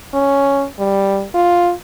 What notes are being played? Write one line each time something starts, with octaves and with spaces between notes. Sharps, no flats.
C#4
G3
F4